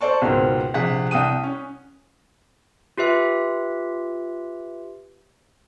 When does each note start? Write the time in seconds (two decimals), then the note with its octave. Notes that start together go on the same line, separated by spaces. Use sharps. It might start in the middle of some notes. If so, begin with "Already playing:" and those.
0.01 A4 C5 D5 A5 C#6
0.22 C#2 G#2 B2 A#3 C4
0.74 A#1 C3 G#4 F#5 B6
1.11 C2 G5 D#6 D#7
1.43 C#4
2.98 F4 G4 B4 E5